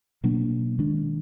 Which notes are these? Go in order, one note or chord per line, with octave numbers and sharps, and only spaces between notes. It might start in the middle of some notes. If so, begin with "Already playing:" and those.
B2 F#3 A#3 D4
D#3 G#3 D4